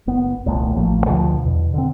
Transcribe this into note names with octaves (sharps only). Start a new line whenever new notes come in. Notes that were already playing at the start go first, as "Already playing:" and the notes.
F#1 B3
D#1 C2 A3
A1 F3 A3 A#3
D2 B2 D3 F3
E2 B2
D3 C4